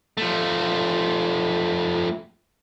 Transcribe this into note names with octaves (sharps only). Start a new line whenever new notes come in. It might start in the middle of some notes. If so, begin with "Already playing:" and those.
F3 A3